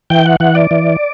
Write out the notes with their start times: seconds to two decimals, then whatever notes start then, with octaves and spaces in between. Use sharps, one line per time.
0.10 E3 G5
0.26 F#5
0.40 E3 F#5
0.55 D5
0.71 E3